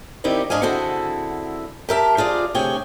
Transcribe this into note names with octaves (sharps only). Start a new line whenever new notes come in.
D#3 C4 D#4 E4 G4 D5
G#2 D4 G#4 D#5 F5 G#5
D3 C4 E4 F#4 G#4 A4
G4 A#4 E5 A5
C4 F4 G#4 D5
D2 C3 G#4 C#5 G5 G#5